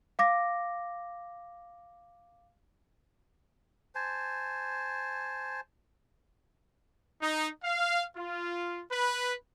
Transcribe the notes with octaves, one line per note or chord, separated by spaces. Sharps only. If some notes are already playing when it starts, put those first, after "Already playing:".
F5 D6 A#6
C5 G#5 A5
D#4
F5
F4
B4